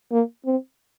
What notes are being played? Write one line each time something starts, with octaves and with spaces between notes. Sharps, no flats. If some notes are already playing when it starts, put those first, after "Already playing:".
A#3
C4